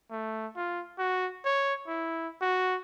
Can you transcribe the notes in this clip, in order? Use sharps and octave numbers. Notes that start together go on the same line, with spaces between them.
A3
F4
F#4
C#5
E4
F#4